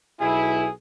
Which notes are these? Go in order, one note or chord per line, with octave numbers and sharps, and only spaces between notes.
B1 B2 E4 G#4